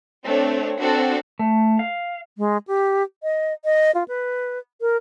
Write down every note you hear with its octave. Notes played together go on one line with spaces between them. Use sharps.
A3 C4 D4 C#5
C4 D4 F#4 A4
A3
F5
G#3
G4
D#5
D#5
F4
B4
A#4